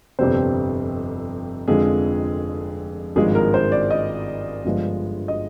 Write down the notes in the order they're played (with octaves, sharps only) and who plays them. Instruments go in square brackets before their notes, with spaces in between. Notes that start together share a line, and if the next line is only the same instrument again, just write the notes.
[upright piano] G1 F2 C3 G3 C4 C5
F1 F2 D3 F3 G#3 G#4
G#1 G2 F3 G#3 G#4
A#4
C5
D5
D#5
G1 G2 F3 G#3
D#5